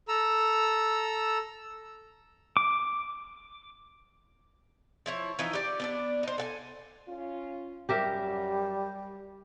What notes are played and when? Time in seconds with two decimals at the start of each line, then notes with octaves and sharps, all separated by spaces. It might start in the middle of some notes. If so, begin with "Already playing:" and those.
0.08 A4 A#5 E6
2.57 D6
5.06 F3 E4 C#5
5.39 E3 F3 D#4 E4
5.53 G4 D5
5.80 B3 D4 D5
6.23 D#4 C5
6.38 A4 F#5 G#5
7.07 C#4 F4
7.89 F#2 G3 G4 A#4 E5